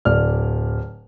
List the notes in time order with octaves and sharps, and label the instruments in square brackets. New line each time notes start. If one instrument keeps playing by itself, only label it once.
[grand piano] D1 D5 F6